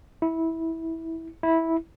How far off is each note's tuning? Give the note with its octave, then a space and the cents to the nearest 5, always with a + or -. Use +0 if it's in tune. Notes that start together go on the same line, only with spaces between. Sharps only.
E4 -15
E4 -10